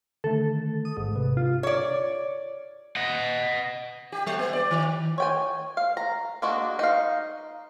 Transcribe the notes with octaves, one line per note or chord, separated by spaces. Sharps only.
D3 D#3 A3 A4
D#6
A1 G#2
C3 B4
F4
C#5 D5
D#5 F#5
G4
G3
B3
D5
D#3
C#5 G5 G#5
F5
A#5
G#3 A#3 D4 F#4
D#4 F5